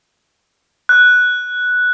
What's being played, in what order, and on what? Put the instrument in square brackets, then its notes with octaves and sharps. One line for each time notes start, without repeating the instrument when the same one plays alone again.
[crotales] F#6